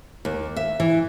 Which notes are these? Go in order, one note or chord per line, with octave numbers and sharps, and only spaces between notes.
D#2
E5
E3